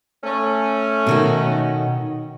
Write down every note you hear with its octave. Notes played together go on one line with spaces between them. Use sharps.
A3 C#4
B2 D#3 F#4